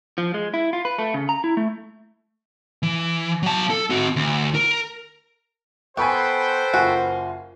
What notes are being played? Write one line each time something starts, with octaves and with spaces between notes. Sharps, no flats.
F3
G#3
E4
F4
B4
A3
C#3
A#5
E4
A3
E3
F#3 A5
A4
C4 F#4
D2
A#4
B3 A4 B4 C5 G5 G#5 B5 C#6
F#1 F4 F#4 G#5